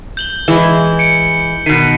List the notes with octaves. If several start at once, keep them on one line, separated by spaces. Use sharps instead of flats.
G6 F#7 G7
E3 G#3
C#7 D7
B2 D#3 B6 C7 D#7